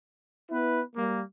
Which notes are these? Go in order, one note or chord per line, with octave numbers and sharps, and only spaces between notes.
B3 E4 B4
G3 A#3